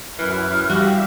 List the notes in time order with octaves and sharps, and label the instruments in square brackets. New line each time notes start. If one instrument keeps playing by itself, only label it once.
[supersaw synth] F#2 E4 [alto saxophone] E3 [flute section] F6 F#6
[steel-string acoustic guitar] G3 [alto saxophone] F#4 [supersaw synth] G4 E5 F5